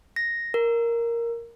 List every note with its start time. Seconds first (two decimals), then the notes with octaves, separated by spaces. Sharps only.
0.16 A#6
0.54 A#4